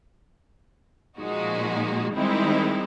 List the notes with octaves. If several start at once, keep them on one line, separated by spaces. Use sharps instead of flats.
A#2 F3 G#3 D#4 F#4
D#3 G3 G#3 C4 D#4 E4